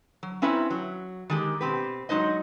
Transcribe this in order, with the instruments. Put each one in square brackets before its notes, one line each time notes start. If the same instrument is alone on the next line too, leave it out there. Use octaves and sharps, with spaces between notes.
[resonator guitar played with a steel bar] F#3
C4 C#4 E4 B4 E5 A#5
F#3
D#3 G#3 G4
B2 C4 G4 B4
F#3 G#3 D#4 C5 D#5